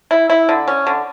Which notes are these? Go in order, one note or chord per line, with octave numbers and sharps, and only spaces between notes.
E4
E4
D3
C#4
D3